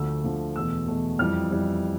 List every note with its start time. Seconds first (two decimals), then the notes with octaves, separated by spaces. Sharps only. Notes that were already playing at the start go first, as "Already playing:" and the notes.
Already playing: D2 D3 F3 A3 E6
0.24 D2 D3 F3 A3
0.55 E2 B2 A3 E6
0.87 E2 B2 A3
1.19 F2 E3 G3 F6
1.51 F2 E3 G3